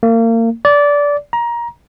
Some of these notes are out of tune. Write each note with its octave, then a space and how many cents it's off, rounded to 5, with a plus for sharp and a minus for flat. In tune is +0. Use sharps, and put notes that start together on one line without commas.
A#3 -35
D5 -20
A#5 +20